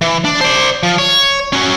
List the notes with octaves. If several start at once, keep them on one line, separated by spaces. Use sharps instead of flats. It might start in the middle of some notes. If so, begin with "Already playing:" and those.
E3
D4
C5 D5
F3
C#5
C#4 F#4